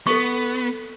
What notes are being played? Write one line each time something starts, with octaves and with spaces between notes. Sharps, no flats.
B3 A4 C#6